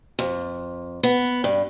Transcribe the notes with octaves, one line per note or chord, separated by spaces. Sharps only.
F2
B3
G2